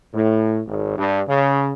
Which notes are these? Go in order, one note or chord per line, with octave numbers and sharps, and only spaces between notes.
A2
G#1
G2
C#3